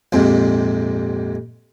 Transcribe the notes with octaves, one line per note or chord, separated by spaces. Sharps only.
A#1 F2 G#2 C3